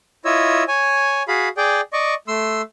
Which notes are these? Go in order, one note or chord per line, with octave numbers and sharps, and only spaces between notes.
E4 F4 C#5 D#5 E6
C#5 G#5
F#4 G#4 F5 B5
G#4 D5 G5
D5 D#5 C#6
A3 C6 E6